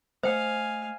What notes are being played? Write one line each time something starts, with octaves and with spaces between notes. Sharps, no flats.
A3 C5 D#5 F5 G5 G#5